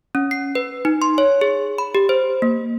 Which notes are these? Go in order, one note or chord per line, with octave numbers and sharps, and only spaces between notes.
C#4
C7
B4
D#4
C6
C#5
G#4
B5
G4
C5
A#3